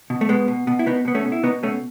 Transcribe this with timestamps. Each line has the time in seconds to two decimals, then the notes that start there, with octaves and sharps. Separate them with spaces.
0.10 B2
0.21 A3
0.29 B2 G#3 B3
0.48 B2
0.67 B2
0.79 E4
0.86 B2 B3 D#4
1.05 B2 B3
1.15 A3 C#4
1.25 B2
1.32 E4
1.43 B2 B3 D#4
1.63 B2 A3 C#4